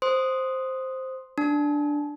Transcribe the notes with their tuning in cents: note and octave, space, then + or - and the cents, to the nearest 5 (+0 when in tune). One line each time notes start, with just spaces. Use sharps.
C5 +0 C6 +0 D#6 +0
D4 +0 A5 -25